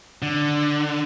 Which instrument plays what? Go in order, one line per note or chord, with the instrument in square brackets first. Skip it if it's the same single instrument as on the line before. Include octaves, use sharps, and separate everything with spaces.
[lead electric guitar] D3